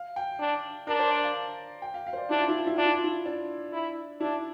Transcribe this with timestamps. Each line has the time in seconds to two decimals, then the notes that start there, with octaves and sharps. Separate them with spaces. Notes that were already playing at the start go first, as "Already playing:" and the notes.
Already playing: F5
0.16 G5
0.40 D4
0.87 D4 A#4
0.99 C5
1.11 D5
1.23 F5
1.82 G5
1.94 F5
2.07 F5
2.13 C5
2.18 D5
2.30 D4 E4
2.40 F4
2.48 E4
2.58 F4
2.67 E4
2.76 D4 F4
2.86 E4
2.95 F4
3.04 E4
3.26 D4
3.73 E4
4.21 D4 E4